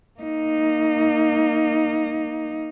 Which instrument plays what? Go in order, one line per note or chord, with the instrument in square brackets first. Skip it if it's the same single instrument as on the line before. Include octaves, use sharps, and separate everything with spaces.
[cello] A#3 D#4